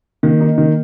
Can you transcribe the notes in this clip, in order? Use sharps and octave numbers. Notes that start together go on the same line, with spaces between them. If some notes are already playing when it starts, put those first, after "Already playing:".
D#3 A#3
D#4
D#3